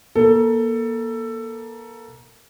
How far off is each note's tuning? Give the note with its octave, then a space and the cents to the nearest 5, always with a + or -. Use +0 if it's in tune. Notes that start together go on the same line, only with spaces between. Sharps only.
A#3 +30 A4 +15